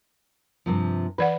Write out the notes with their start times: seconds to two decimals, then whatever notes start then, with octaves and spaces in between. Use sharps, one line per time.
0.66 G2 C3 F3
1.18 E3 B4 D5 F#5